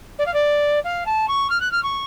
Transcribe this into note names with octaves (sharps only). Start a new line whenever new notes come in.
D5
F5
D5
F5
A5
C#6
F6
F#6
F6
C#6